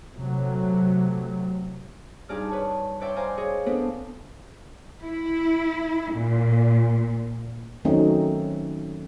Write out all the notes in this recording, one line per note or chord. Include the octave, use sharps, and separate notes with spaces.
C3 F#3 A3
G2 D#4 G#4 D5 F6
B4 C#5 A5
B4 C#5 D5 E5 G5 C6
C5 F5 G#5 A#5 C6 D6
G#4 C#5 D#5
B3 C4 D4 A4 B4 C5
E4
A#2
D#3 F#3 A3 C4 C#4 D#4